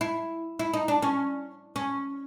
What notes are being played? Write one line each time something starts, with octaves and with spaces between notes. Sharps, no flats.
E4
E4
D#4
D4
C#4
C#4